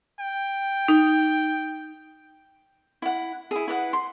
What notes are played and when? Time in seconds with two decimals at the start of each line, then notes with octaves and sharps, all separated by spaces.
0.20 G5
0.88 D#4
3.02 E4 F#5
3.51 E4 G#4
3.68 E4 B4 F#5
3.93 C6